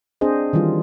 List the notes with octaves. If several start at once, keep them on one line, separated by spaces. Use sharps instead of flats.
C4 D4 G#4 C5 D#5
D#3 E3 G3 F4